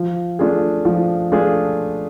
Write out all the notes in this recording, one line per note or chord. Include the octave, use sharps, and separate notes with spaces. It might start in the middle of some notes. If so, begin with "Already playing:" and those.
Already playing: F3
A3 D4 F4 G#4
F3
A3 D4 F4 G#4